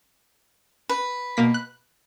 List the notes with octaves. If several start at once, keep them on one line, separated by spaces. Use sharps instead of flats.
B4
B2 A#3 B6
F#6